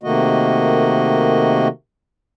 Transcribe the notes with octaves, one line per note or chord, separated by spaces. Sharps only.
C3 D#3 A3 A#3 F#4 D#5